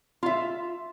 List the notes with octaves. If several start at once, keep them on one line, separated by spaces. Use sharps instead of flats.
F4 E5